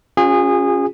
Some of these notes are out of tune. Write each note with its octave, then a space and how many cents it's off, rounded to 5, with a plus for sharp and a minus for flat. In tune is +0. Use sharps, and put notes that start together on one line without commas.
C#4 +0 F4 +35 G#4 -25